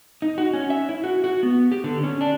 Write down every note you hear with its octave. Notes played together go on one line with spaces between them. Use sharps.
D#4
F#4
C#4
E5
E4
F#4
F#4
B3
G4
D3
C#4
D4